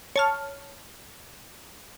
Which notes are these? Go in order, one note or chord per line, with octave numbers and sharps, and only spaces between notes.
C#5 A5 F6